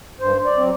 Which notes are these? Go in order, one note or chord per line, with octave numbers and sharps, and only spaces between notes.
G2 C5
D5
F#3 C4